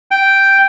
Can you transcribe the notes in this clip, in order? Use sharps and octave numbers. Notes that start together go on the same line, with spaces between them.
G5